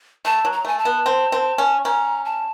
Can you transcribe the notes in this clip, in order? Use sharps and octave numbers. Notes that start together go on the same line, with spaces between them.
A3 A5
F#3
A#5
A3 G#5
A5
B3
C4
C4
C#4
C#4 A#5
A5